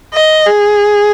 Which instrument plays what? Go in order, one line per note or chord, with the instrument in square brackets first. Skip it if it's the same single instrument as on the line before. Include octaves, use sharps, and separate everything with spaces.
[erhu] D#5
G#4